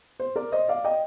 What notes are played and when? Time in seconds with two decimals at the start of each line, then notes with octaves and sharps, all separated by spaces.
0.20 C5
0.36 A#4 D5
0.52 C5 D#5
0.68 D5 F5
0.84 D#5 G5